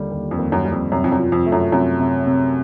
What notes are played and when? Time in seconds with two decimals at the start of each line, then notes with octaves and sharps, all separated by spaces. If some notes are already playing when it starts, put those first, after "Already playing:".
Already playing: D#2 D3 G3
0.11 D#2
0.31 F2
0.38 D#2
0.52 F#2
0.65 G3
0.72 F2
0.92 F#2 C3
1.04 F2
1.12 F#2
1.19 F3
1.32 F2
1.46 A3
1.52 F#2
1.72 F#2 C3
2.00 C3
2.26 C3